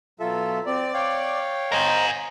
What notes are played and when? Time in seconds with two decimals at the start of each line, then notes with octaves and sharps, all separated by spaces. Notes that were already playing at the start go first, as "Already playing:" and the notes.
0.20 B2 F#3 F4 A4 E5
0.66 C4 D5
0.94 C#5 F5 G5
1.72 A#4 C5 D#5 G#5 A#5